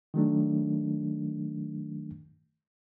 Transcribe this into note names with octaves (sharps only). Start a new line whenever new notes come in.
D#3 F#3 A3 D4